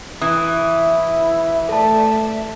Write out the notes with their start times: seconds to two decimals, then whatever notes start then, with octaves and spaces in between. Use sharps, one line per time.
0.21 E3 E4 D#6
1.69 A3 A4 D5 E5 A5